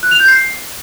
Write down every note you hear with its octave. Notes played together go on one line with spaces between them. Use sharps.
F#6
F7
G6
C7